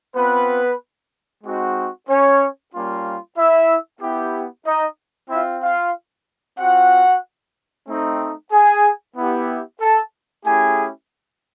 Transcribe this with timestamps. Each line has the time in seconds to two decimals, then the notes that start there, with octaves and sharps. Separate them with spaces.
0.15 B3 C4 F4 B4
1.44 G#3 C4 D#4 F#4
2.08 C#4 C#5
2.73 G3 A#3 C#4 F4
3.37 E4 E5
4.01 B3 E4 G4
4.65 D#4 D#5
5.29 C4 E4 F4 E5
5.62 F4 F5
6.58 C4 F4 F#4 F#5
7.88 A3 C4 D#4
8.51 G#4 G#5
9.15 B3 E4 G4
9.80 A4 A5
10.44 A3 C#4 E4 G4 G#4 G#5